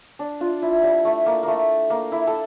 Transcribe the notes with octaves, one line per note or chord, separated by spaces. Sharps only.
D4
D4 F4
E4
G3
A3
A#3
A3 A#3
A#3
E4
A4